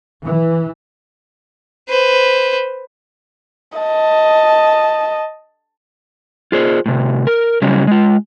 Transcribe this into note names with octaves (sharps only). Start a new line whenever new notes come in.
E3
B4 C5
D#5 A5
F4 G#4 C5
A2 C3
A#4
C#3 F#3 G3 C#4
G#3 F4